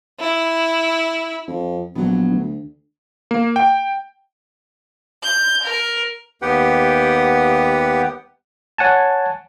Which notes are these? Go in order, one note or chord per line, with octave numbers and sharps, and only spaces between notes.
E4
F2
A#1 F#3 B3
D2
A#3
G5
G6
A#4
D#2 B3 G4 B4 F#5 G5
C#5 F#5 G#5 A5